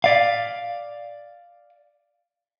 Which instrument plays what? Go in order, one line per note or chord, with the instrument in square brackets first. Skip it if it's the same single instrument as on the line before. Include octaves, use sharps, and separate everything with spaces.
[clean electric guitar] D5 F5